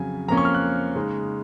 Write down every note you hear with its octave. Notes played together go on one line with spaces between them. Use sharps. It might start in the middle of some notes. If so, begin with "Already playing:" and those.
Already playing: F2 C#3 F#3 G#5
F2 F3 A#3 C#4 A#5
C#6
F6
F#6
C#3 G#3 D#4